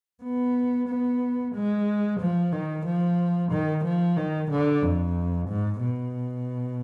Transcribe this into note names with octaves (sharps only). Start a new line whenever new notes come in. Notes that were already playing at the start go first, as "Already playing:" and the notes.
B3
B3
G#3
F3
D#3
F3
D#3
F3
D#3
D3
F2
G#2
B2